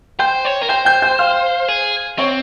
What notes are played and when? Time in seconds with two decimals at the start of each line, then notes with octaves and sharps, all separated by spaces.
0.19 C5 G5 G6
0.45 C#5
0.61 A#4
0.69 C5 G5 G6
0.85 G5 G6
1.02 G5 G6
1.19 F5 F6
1.68 G#4
2.18 C4 C#5 C#6